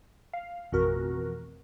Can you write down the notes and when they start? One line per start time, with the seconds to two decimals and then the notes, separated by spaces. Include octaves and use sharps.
0.33 F5
0.72 A1 F2 B2 F#4 A#4